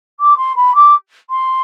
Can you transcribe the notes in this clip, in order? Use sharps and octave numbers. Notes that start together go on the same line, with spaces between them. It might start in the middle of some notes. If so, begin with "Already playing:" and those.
D6
C6
B5
D6
C6